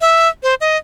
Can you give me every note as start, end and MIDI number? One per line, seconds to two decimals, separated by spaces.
0.01 0.28 76
0.43 0.54 72
0.61 0.77 75